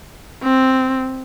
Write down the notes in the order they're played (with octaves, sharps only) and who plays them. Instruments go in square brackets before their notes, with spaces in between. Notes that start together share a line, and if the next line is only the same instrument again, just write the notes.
[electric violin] C4